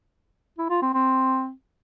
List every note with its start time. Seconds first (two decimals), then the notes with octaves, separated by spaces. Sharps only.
0.58 E4
0.70 F4
0.82 C4
0.94 C4